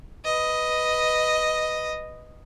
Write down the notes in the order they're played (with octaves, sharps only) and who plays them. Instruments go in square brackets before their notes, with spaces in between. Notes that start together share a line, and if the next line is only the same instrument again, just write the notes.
[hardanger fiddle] B4 D#5